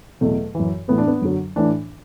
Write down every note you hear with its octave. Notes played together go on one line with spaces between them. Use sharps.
E2 B2 F#3 A3
F#2 E3
A2 E3 B3
D4
B3
F#2 D3 F#3
A2 E3 D4